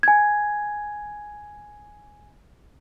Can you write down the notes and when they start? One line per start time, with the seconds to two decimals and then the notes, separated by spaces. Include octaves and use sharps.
0.03 G#5 G#6